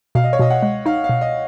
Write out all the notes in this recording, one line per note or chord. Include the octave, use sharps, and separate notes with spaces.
B2 F5
D#5
C#5
B2 D#5
F#5
G#3
D#4 F5
F5
B2
D#5